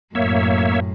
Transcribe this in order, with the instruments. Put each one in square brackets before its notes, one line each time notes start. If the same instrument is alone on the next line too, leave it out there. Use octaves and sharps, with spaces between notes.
[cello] F#2 A2 [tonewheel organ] A#3 C#5 E5